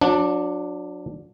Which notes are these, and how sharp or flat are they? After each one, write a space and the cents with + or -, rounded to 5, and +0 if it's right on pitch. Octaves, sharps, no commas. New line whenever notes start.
F#3 -35 D4 +0